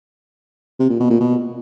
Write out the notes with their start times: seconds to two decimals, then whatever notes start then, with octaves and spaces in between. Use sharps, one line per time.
0.80 C3
0.90 A#2
1.00 B2
1.10 A#2
1.20 B2